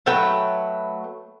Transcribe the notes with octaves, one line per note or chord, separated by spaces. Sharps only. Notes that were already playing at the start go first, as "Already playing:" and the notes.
F#3 A3 B4 G5